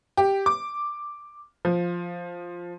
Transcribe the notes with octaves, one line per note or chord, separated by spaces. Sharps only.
G4
D6
F3